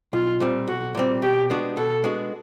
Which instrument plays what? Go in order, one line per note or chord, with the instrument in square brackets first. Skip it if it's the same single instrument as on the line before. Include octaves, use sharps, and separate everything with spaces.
[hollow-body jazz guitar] B1 [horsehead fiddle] F4
[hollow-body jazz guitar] A#2 G3 C4
[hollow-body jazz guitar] B1 [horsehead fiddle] F#4
[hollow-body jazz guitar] A#2 G3 C4
[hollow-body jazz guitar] B2 [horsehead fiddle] G4
[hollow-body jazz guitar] G#3 B3 D4 F#4
[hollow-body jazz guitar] B2 [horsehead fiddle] A4
[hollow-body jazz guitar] G#3 B3 D4 F#4